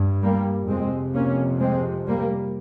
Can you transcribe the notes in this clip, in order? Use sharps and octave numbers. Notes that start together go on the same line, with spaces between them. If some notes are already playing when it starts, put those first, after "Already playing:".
Already playing: G2
G3 A#3
F2 C3 G#3 C4
A#3 C#4
G#3 C4
G3 A#3